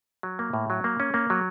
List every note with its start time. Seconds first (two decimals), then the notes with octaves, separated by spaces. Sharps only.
0.23 F#3
0.39 A#3
0.53 A2
0.70 F#3
0.84 A#3
1.00 C#4
1.14 A#3
1.30 F#3